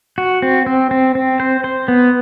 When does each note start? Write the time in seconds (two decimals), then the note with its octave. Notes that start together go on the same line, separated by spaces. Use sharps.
0.18 F#4
0.42 C4
0.66 C4
0.91 C4
1.15 C4
1.40 C5
1.64 C5
1.88 B3